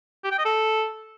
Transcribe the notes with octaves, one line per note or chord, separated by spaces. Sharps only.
G4
G5
D#5
A4